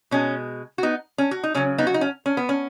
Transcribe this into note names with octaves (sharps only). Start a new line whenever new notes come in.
B2 G#3 C#4
F#4
B3 D#4
C#4
F#4
D#4
C#3 F#3 C#4
B3 D#4
F#4
D#4
C#4
C#4
B3
C#4